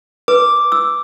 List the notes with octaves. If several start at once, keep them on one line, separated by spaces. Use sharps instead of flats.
B4 D6
E6